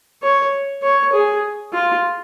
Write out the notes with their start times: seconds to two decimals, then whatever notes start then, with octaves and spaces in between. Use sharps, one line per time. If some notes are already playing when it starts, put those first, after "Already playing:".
0.22 C#5
0.82 C#5
1.12 G#4
1.73 F4